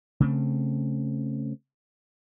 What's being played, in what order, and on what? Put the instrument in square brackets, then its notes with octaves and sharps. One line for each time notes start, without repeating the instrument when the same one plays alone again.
[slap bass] C#3 A3 C4